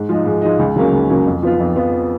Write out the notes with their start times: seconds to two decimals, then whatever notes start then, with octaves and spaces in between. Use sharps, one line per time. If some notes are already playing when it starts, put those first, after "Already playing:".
Already playing: G#2
0.09 F3 G#3 D#4
0.26 G#2
0.42 F3 G#3 D#4
0.59 C#2
0.76 C#3 F#3 A#3 C#4
0.92 C#2
1.10 C#3 F#3 A#3 C#4
1.27 F2
1.43 F3 B3 F4
1.60 F2
1.76 F3 B3 F4